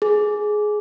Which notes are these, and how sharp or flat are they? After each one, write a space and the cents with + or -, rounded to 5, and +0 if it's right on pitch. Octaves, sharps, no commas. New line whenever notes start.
G#4 +15